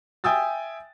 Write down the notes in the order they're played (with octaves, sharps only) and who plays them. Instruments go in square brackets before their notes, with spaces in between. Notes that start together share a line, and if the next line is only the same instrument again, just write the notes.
[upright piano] E5 G5 G#5 D#6 E6 A6